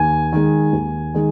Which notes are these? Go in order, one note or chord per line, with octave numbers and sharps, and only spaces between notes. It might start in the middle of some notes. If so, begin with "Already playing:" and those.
Already playing: D#2 G#5
D#3 G#3
D#2
D#3 G#3